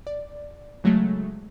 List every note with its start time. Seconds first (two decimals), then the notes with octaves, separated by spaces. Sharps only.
0.07 D5
0.84 C#3 F#3 G#3 A3